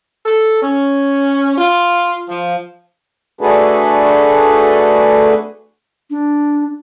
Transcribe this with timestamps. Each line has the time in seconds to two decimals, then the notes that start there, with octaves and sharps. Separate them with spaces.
0.26 A4
0.62 C#4
1.58 F4
2.29 F3
3.41 A3 D4 F#4 G#4 A4 B4
6.10 D4